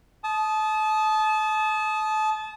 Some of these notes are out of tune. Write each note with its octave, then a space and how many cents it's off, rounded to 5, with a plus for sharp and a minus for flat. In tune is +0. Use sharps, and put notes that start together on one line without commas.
A5 -30 D#6 +0